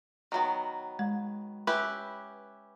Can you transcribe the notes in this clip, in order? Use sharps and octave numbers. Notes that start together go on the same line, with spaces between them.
D#3 F#3 B3
G#3
C#4 E4 G4 B4